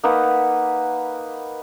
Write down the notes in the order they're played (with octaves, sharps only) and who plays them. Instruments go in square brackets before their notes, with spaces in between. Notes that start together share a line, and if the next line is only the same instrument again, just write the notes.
[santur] A#3 D#4 B4 F#5